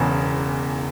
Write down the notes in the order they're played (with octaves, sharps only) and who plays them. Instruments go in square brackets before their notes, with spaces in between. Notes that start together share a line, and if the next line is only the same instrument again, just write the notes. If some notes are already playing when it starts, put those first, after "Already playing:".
Already playing: [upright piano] E1 E2 C#3